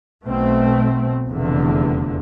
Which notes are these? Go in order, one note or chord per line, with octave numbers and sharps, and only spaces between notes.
B1 B2 A3 C4
F1 E2 D3